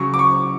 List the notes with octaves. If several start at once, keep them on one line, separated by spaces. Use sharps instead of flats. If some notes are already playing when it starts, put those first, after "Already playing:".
Already playing: C#3 F#3 C#6
D6
C#6